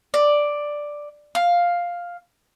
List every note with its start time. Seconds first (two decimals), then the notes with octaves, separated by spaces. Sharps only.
0.14 D5
1.35 F5